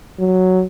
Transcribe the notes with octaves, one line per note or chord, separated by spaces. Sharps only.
F#3